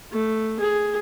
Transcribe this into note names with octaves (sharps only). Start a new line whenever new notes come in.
A3
G#4